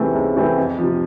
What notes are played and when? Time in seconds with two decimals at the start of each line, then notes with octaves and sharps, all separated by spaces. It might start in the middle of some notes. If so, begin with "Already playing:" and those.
Already playing: C#2 C3 E3 A3 C4
0.14 C#2
0.36 C3 E3 A3 C4
0.58 F2
0.78 C3 F3